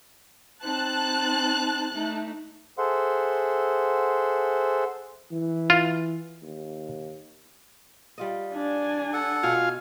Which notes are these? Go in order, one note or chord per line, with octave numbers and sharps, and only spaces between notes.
C4 D#4 A5 F#6
A3 D#4
G#4 A4 C5 E5 F#5 C6
E3
F4
D#2
G3 F4 D#5
D4 G#5
A4 F#5
B2 F4 F5 G#5